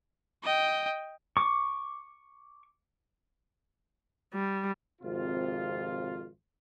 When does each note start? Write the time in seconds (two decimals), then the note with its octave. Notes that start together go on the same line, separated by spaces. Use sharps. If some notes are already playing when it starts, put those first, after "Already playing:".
0.44 D#5 G5
1.37 C#6 D6
4.34 G3
5.02 G#1 F2 C3 F4